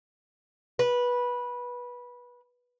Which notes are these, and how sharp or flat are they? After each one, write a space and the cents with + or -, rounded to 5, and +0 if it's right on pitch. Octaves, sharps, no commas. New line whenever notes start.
B4 -15